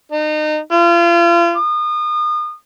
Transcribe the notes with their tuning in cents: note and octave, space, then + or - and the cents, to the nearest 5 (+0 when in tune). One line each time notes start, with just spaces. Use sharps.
D#4 -30
F4 -35
D#6 -35